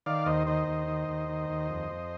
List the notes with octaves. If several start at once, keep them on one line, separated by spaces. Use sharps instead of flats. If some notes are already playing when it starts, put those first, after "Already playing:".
D#3 D5 F5
D#2 C5 D#5
D#3 C5 D#5
D#2
D#3
D#2
D#3
D#2
F2
F2